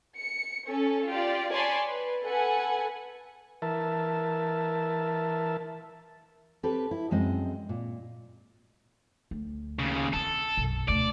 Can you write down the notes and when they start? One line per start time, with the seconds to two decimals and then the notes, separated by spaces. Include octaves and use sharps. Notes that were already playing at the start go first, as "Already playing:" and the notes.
0.18 C#7
0.68 C#4 A4
1.09 F4 G4 D5
1.53 C#5 D5 G#5 A5 B5 C6
1.87 B4
2.24 A4 B4 F#5 G#5
3.62 E3 A#4 E5 A5
6.63 C4 G4 A4 B4
6.91 E4
7.11 F#2 G#3 C4 D#5
7.69 A#2
9.31 D2
9.79 D#2 C#3
10.13 C4 E4 A4
10.57 B1 F#2
10.89 D2 B2 D5